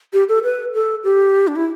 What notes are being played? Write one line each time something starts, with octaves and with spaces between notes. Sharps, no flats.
G4
A4
B4
A4
G4
D4
E4